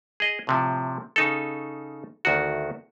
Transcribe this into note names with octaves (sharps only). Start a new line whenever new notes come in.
G#4 D#5
A2 C3 F3
C#3 D#4 A4
D2 D#3 F#4